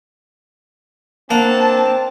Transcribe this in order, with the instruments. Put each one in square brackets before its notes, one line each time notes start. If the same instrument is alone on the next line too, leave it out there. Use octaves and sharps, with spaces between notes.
[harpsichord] A#3 [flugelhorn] C4 [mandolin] D4 F#5 [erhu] A5